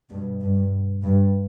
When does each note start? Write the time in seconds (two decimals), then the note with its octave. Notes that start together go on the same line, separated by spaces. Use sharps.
0.11 G2 B2
0.42 G2
1.03 G2